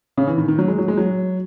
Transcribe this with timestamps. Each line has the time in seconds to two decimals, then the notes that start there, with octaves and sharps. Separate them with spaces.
0.17 C#3
0.27 E3
0.38 D#3
0.48 D#3
0.59 F#3
0.68 G#3
0.78 F#3
0.88 G#3
0.97 F#3